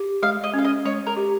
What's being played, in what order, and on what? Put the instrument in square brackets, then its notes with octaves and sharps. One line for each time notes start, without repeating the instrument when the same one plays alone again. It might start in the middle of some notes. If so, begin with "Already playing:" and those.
Already playing: [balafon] G4
[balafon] G#3 [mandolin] F5
[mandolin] D#5
[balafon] C#4 [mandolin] F5
[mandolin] D#5
[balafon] G#3 [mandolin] C#5
[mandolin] A#4
[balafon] G4